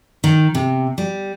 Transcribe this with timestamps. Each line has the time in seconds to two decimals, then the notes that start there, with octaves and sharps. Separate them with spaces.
0.24 D#3
0.55 C3
0.98 G3